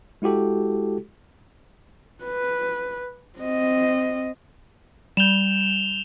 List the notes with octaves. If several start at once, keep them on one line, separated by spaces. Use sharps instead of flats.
G#3 E4 F#4 G4 A4
B4
C4 D#5
G3 G6 E7 F7 G7